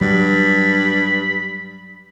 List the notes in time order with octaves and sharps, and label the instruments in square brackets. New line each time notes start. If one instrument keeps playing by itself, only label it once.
[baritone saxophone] G2 [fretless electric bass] F#3 G3 [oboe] B5